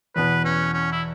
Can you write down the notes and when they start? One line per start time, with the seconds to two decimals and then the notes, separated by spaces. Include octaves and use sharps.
0.16 E2 B2 B3 B4
0.45 C#4
0.74 C#4
0.92 E4